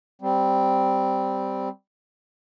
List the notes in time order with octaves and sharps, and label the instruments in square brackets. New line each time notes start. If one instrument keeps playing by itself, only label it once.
[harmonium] G3 C4